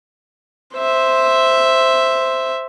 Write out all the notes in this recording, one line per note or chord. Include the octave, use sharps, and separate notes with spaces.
C5 E5